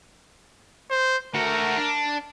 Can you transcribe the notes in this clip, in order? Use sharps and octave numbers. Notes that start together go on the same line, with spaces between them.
C5
A3 F#4 A#4
D4